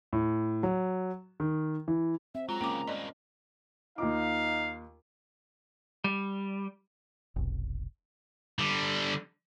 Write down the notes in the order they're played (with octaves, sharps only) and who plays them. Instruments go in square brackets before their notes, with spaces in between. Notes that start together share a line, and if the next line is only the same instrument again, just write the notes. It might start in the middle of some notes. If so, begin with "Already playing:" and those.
[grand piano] A2
F#3
D#3
E3
[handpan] C4 [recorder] E5
[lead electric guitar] F#3 [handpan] G#3 [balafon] F4 [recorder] A#5
[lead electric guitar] F#2 C#3 [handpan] A#3 C#4 [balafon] G5 D6
[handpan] C#4
[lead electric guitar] G2 A#3 [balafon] D5 D#5
[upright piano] D#2 F4 D6 [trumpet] D#4 [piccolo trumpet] F5
[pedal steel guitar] G3
[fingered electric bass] F1 B1
[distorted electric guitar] D3 G3